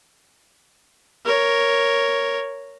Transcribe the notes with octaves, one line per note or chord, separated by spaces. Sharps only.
A#4 C#5